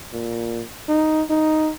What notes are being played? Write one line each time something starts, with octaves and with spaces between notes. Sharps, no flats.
A#2
D#4
D#4